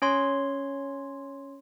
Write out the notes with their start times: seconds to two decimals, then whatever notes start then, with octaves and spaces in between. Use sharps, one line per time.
0.02 C#4 C#5 C6